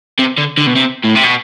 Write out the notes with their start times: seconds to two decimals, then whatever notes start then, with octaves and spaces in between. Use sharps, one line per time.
0.19 C3
0.38 D3
0.58 D3
0.67 B2
0.76 C3
1.05 A2
1.16 C3
1.24 B2